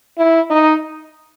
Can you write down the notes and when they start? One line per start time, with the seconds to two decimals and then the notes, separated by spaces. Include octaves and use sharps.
0.18 E4
0.50 D#4